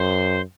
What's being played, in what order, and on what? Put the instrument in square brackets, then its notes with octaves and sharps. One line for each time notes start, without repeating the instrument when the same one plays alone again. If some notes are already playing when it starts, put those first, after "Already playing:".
Already playing: [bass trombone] F#2 [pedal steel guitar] C5